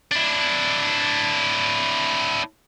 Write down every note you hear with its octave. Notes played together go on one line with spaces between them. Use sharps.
D4 E4